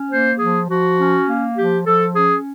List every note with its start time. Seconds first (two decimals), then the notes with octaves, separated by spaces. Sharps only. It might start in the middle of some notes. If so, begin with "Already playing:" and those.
Already playing: C#4
0.10 A#3 C5
0.39 F3 G#4
0.68 F3 F#4
0.98 C#4
1.27 A#3
1.57 F3 G4
1.86 F3 A4
2.15 C#4 G#4